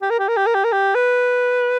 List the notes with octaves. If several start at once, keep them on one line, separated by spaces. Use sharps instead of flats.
G4
A#4
G4
A#4
G4
A#4
G4
A#4
G4
B4